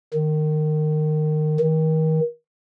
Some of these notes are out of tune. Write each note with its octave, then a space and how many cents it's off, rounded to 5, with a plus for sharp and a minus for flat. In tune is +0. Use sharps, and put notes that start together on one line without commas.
D#3 -20
D#3 +30